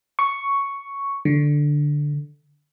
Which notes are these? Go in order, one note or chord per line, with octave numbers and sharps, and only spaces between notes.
C#6
D3